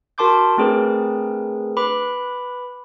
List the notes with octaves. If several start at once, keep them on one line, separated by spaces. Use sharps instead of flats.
F#4 A#4 A5 C6 D6 G6
A3 C4 D4 G#4 A#4 B4
B4 B5 D6